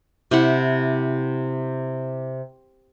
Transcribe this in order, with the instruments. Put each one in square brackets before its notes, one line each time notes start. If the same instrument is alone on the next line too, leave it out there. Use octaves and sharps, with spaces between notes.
[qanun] C3 E4 F#5